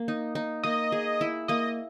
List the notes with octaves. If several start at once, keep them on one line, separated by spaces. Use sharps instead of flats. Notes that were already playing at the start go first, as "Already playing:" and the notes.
Already playing: A#3
D#4
D#4
A#3 D#5
G#4
E4
A#3 D#5